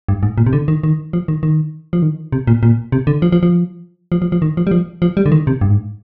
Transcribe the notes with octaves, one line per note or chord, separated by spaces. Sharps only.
G2
G#2
A#2
C3
D3
D#3
D#3
F3
D#3
D#3
F3
D#3
C3
A#2
A#2
C3
D3
F3
F3
F3
F3
F3
F3
D#3
F3
G3
F3
F3
G3
D3
D#3
C3
G2
G#2